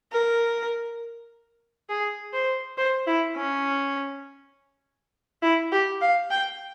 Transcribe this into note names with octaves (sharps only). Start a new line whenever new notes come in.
A#4
G#4
C5
C5
E4
C#4
E4
G4
F5
G5